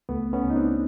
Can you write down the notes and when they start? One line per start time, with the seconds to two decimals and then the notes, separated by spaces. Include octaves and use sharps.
0.09 C#2 A3 B3
0.33 B3 C#4
0.44 C#2
0.50 D#4
0.56 C4 D4